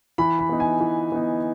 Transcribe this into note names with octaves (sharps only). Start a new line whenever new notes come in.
E3 B5
B5
B3 D#4
G#5
E3
B3 D#4